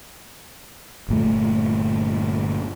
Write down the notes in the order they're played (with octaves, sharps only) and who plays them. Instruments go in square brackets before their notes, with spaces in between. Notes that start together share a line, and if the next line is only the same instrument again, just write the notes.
[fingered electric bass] G1 A#2 A3